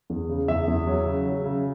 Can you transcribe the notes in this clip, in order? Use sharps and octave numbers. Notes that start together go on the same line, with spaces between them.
E2
C#3
E2 E5
E2
F#3
C#3
F#3
C#3